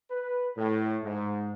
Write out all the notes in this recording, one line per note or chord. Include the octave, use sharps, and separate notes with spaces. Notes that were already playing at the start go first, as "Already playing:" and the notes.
B4
A2
G#2